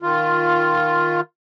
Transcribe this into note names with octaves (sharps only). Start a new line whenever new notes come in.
D#3 F4